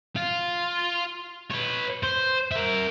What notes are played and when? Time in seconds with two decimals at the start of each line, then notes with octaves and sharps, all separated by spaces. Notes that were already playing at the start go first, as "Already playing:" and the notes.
0.16 F4
1.51 B4 C#5
2.03 C5
2.51 A#4 E5